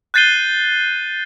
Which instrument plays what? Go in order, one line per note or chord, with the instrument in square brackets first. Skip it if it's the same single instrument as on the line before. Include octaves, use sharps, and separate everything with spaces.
[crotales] F#6 G6 A6 C7 D#7 G7